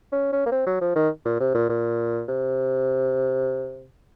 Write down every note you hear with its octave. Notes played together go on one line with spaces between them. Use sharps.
C#4
C#4
A#3
C4
F#3
F3
D#3
A#2
C3
A#2
A#2
C3